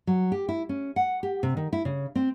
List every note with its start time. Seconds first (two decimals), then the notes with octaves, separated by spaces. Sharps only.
0.07 F#3
0.32 G4
0.49 E4
0.69 C#4
0.96 F#5
1.23 G4
1.43 C3
1.57 D#3
1.73 E4
1.85 C#3
2.15 C4